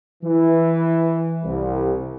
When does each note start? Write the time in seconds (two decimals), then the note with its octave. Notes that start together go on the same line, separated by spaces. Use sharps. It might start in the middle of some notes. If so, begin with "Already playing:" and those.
0.24 E3
1.44 C2